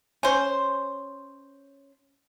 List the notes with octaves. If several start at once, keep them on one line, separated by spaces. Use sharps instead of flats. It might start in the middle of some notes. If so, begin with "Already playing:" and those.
C#4 C5